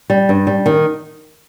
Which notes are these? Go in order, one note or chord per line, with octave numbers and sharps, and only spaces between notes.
G3
G2
G3
D#3